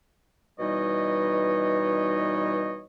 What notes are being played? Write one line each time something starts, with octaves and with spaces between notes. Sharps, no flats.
B2 E3 G3 D#4 C#5 D#5